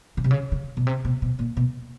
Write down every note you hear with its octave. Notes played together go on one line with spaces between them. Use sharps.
C#3
C3
C#3
C#3
B2
C3
B2
B2
A#2
B2